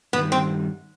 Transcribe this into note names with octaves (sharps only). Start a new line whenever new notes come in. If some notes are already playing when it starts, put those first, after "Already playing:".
G2 D#3 G3 B3
C4